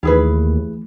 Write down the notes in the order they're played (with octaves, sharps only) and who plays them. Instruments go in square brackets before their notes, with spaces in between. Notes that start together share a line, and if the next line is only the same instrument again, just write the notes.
[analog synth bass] D#2 [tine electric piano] E3 A3 [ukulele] E4 G#4 B4